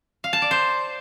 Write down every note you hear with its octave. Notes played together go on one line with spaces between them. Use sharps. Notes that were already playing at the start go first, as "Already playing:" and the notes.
F5
A5
D5
C5